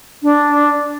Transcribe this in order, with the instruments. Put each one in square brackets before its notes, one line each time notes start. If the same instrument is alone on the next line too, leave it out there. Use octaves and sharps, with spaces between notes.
[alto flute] D4